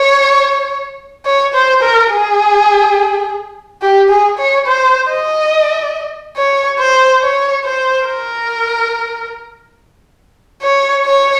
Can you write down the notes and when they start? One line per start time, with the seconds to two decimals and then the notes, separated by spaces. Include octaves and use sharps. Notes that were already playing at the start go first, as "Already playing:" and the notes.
Already playing: C#5
1.26 C#5
1.54 C5
1.83 A#4
2.11 G#4
3.81 G4
4.10 G#4
4.39 C#5
4.67 C5
5.09 D#5
6.37 C#5
6.79 C5
7.22 C#5
7.65 C5
8.08 A#4
10.63 C#5
11.05 C#5